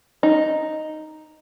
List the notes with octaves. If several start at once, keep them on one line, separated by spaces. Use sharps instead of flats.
D#4